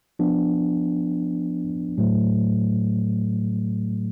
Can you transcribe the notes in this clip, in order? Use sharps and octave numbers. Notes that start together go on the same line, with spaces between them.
F3 B3 D4
A2 F#3 A3